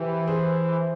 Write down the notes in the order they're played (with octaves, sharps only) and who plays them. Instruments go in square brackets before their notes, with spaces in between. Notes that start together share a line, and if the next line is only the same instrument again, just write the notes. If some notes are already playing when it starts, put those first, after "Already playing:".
Already playing: [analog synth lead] E3 [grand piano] G4 C5
[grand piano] G#4 C5